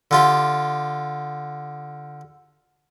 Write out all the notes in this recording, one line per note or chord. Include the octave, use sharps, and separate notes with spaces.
D3 F4 G4